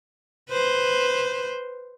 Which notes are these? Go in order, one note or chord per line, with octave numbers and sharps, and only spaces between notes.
B4 C5